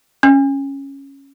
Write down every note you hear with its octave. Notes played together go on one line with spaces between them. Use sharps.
C#4